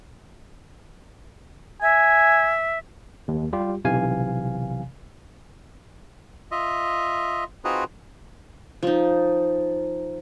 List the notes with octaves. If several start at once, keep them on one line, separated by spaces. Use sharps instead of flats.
E5 G#5
D#2
G3 F4 G4
B1 C3 E3 F5 G#5
F4 D#5 E5
C4 D#4 F4 F#4 G#4 B4
F3 D#4